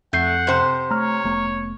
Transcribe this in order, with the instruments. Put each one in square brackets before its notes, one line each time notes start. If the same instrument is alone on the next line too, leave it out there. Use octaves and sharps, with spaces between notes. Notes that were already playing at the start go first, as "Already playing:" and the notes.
[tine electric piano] F2 G6 C7 [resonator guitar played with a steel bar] A3 [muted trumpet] F#5
[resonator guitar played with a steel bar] C3 C5
[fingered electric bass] A3 [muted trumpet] C#5 [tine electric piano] A#5 F6
[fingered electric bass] F1 A3 B3